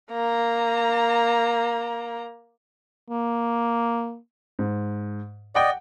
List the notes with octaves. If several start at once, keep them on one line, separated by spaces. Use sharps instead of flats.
A#3 A#5
A#3
G#2
D5 D#5 F#5 G5